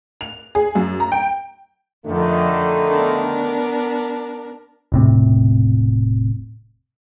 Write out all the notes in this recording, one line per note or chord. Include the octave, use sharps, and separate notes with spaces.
F7
G#4
F#2
A#5
G5
F2 D3 D#3 A3
B3 D4 A#4
E1 A2 C3